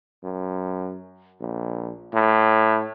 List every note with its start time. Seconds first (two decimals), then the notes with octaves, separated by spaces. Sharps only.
0.24 F#2
1.40 A#1
2.14 A2